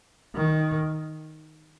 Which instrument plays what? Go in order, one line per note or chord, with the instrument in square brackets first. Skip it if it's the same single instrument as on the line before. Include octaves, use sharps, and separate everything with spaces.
[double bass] D#3